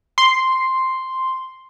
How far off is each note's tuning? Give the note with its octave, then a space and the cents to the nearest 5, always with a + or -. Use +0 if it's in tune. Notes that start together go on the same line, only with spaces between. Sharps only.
C6 +0